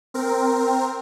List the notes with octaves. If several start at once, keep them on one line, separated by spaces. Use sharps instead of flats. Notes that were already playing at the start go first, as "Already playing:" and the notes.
C4 A#4